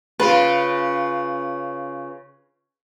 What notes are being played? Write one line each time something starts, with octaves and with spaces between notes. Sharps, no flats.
C#3 F4 B4